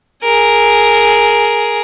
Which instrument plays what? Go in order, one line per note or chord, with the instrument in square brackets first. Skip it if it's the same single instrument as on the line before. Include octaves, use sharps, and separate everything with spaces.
[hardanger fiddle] G#4 A#4